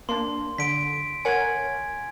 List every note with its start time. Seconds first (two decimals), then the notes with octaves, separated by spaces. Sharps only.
0.09 A#3 D4 C6
0.58 D3 B6 D7
1.25 A#4 C#5 F#5 G#5 G#6